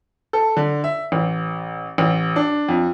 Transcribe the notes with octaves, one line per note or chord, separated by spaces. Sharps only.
A4
D3
E5
A1
A1
D4
F2